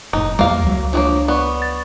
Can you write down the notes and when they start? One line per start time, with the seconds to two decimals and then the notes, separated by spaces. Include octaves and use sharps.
0.13 F1 A2 D#4
0.39 E2 G3 A#3 F5
0.63 C#2 F#3
0.93 F3 G#3 A#3 D4 C#5
1.28 B3 D5 C#6
1.62 A6